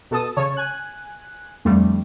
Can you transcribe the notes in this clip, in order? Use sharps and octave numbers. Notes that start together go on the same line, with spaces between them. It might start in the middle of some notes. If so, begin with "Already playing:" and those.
B2 A4 A5 D#6
C#3 C#5 A5
G#5 F#6
F2 D3 G3 A3